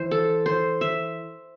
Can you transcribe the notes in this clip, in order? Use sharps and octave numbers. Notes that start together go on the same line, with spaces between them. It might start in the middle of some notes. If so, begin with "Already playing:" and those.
Already playing: E3 C5
A4
C5
E5